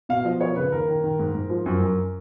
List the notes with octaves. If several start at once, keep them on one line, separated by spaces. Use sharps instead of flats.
B2 F5
F3 D#5
F3 C#5
C#3 B4
D#2 A#4
D#3
D#3
G#2
G#2
F3
F#2
F#2